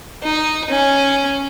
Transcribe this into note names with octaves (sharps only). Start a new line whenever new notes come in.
D#4
C#4